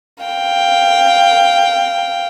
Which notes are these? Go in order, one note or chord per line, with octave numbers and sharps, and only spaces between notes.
F5 G5